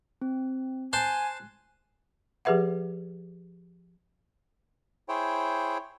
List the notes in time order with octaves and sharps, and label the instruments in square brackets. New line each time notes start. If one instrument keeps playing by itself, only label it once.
[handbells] C4
[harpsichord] C5 A5 C6 [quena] G#5 [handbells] F#6
[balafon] F3 G4 G#4 B4 E5 F#5
[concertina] E4 G#4 C5 C#5 G5